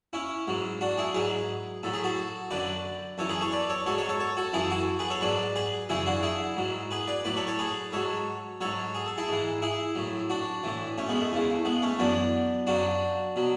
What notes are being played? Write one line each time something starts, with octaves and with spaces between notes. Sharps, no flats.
C#4 E4
G#2 F#3
D4 F#4
E4 G#4
G#2 F#3 G#4 B4
A2 F#3 A4
G#4
F#4 A4
F#2 D3 F#3 B4 D5
F#2 E3 A4 C#5
G#4 B4
A4 C#5
B4 D5
A4 C#5
G#2 F#3 A4 C#5
A4 C#5
A4 C#5
A4 C#5
F#4 A4
F#2 E3 E4 G#4
F#4 A4
G#4 B4
A4 C#5
G#2 F#3 B4 D5
G#4 B4
F#2 C#3 E3 E4 G#4
D4 F#4
E4 G#4
G#2 F#3
G#4 B4
B4 D5
A2 F#3 B4 D5
A4 C#5
A4 C#5
G#4 B4
G#2 F#3 A4 C#5
G#2 F#3 A4 C#5
G#4
A4
E4 G#4
G#2 E3
E4 G#4
A2 F#3
D4 F#4
A2 E3
A3 C#4
G#3 B3
A3
E2 C#3 E3
G#3 B3
A3 C#4
F#2 E3 B3 D4
F#2 C#3 F#3 D4 F#4
B2 F#3